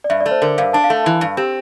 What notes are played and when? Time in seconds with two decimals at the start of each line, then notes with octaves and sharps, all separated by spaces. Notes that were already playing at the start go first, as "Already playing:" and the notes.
0.04 D5
0.10 G2 E5
0.21 D5
0.26 A3
0.31 C5
0.42 D3 A#4
0.58 G2 F5
0.73 D4 A5
0.84 F5
0.90 A3
1.06 E3
1.21 G2
1.37 C4 G4